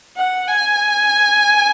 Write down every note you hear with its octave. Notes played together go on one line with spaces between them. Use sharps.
F#5
G#5